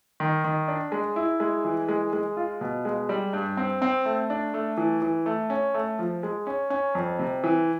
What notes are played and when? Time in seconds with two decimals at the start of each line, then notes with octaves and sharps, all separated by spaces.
0.20 D#3
0.44 D#3
0.68 D4
0.92 G#3
1.16 E4
1.40 G#3
1.64 E3
1.89 G#3
2.13 G#3
2.37 F4
2.61 B2
2.85 G#3
3.09 G3
3.33 G2
3.57 C4
3.82 C4
4.05 A3
4.30 D4
4.54 A3
4.77 E3
5.02 E3
5.26 A3
5.50 C#4
5.74 A3
5.99 F3
6.23 G#3
6.47 C#4
6.70 C#4
6.95 F2
7.19 C3
7.44 E3